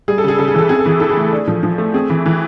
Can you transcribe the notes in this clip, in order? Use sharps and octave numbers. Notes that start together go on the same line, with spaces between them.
G3 G#4
A4
C#3 G#4
C#3 A4
G#4
E3 A4
C4 G#4
A4
E3 G#4
E4 A4
G#4
A3
D4
F3
F3
A3
C4 G#4
E3
E3